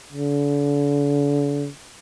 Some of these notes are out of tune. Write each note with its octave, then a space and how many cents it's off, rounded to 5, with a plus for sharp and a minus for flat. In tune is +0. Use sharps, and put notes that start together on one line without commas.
D3 -40